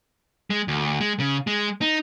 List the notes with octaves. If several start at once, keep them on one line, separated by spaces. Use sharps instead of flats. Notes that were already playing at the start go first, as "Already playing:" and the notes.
G#3
D2
G#3
C#3
G#3
D#4